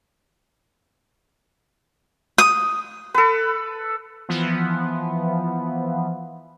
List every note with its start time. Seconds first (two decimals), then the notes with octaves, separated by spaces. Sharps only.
2.38 D#6
3.14 A4 B4
4.29 E3 F3 B3